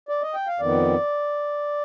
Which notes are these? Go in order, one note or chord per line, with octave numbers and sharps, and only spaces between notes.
D5
D#5
G5
F5
F2 D#3 B3 D5